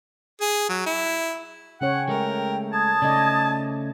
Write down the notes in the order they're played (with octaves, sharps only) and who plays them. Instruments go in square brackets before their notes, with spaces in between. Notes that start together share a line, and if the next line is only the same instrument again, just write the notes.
[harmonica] G#4
F#3
E4
[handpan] C#3 C#4 C#5 [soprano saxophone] F#5 [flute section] G5
[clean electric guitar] G#3 A3 [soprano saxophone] A#4
[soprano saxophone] A5 [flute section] D#6 G#6
[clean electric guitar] C#3 A3 C#4 [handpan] D5 D#5